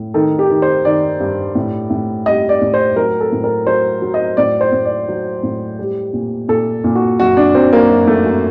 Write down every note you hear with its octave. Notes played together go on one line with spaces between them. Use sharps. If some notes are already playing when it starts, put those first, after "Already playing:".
Already playing: A2
D#3 A4
G4
D#3
C5
D#3 D5
G2
A2
A2
G3 D#5
D5
A2
C5
F#3 A#4
A4
A2
A#4
F#3 C5
F#3
D#5
A2 D5
C5
A2
D5
F#3
A2
G3
A#2
A#2 A4
A#2
F#4
F#2 F#4
D4
F#3 C4
A#3
F#2
A3
F#2